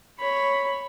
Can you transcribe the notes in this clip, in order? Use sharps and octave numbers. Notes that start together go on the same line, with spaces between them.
C#5 B5